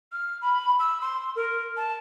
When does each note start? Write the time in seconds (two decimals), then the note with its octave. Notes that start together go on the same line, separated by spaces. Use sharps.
0.12 F6
0.42 B5
0.79 E6
1.01 C6
1.36 A#4
1.77 A5